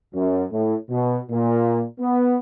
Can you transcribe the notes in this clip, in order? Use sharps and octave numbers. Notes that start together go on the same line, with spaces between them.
F#2
A2
B2
A#2
B3